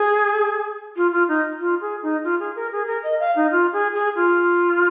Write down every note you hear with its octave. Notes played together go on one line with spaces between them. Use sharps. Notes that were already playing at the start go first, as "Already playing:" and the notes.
Already playing: G#4
F4
F4
D#4
F4
G#4
D#4
F4
G#4
A#4
G#4
A#4
D#5
F5
D#4
F4
G#4
G#4
F4